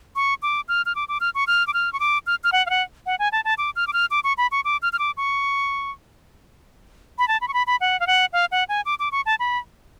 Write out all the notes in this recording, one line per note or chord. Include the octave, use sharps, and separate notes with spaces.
C#6
D6
F6
F6
D6
D6
F6
C#6
F6
D6
F6
C#6
D6
F6
F6
F#5
F5
F#5
F#5
G#5
A5
A5
D6
F6
D6
F6
D6
C#6
B5
C#6
D6
F6
F6
D6
C#6
B5
A5
B5
C#6
B5
B5
F#5
F5
F#5
F5
F#5
G#5
D6
D6
C#6
A5
B5